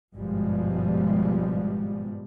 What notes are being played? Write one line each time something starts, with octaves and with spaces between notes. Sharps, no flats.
G#1 G2 B2 F3 G3 G#3